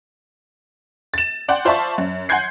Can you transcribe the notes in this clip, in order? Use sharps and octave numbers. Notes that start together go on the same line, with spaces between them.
A6 E7
D5 F#5 G5 C6
F4 C5 D5 E5 A5 C#6
F#2
F#5 G#5 C6 G6 G#6 C7